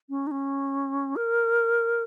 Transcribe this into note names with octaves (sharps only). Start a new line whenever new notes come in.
C#4
D#4
C#4
A#4